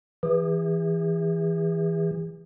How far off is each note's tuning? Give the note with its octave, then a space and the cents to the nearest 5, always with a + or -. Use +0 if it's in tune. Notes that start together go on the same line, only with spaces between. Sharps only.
E3 +0 G#4 -40